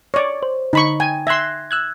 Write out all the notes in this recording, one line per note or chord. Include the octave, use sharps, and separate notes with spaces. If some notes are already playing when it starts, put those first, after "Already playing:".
C#5 D5
C5
D3 D#4 B5 C#6
G5 G#5
E5 C6 F#6 G#6 A#6
E6 F#6 G#6